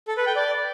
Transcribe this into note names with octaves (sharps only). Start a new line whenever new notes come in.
A4
B4
G5
D5